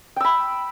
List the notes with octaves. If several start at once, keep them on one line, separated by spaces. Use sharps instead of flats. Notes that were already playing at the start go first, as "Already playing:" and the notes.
G5 B5 E6